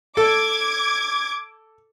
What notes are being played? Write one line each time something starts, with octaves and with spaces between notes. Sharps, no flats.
A4 D6 G#6